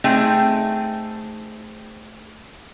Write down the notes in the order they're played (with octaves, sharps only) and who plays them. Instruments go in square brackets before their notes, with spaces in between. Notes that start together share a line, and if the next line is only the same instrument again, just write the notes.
[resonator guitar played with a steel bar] A3 C4 D#4 G#4 G5